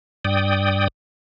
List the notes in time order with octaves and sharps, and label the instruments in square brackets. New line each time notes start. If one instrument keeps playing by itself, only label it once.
[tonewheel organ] G2 D5 G5 D#6